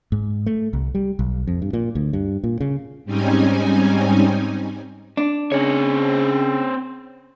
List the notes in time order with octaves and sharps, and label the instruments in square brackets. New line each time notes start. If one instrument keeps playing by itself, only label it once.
[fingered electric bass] G#2
A3
C2
G3
B1
F2
G2
A#2
D2
G2
A#2
C#3
[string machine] G#2 G3 C4 C#4 D#4 G#5
[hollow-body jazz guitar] D4
[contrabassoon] C#3 [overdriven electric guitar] C4 C#5